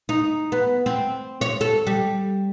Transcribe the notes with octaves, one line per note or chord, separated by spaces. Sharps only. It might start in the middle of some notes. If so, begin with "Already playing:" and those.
D#4
B3
C4
C#5
A4
G3